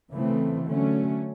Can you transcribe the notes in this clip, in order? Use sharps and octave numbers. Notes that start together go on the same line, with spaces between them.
C#3 E3 A3 C4
D3 F#3 A3 C#4